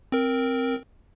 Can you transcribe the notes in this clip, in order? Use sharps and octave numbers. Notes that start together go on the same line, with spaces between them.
C4 A#4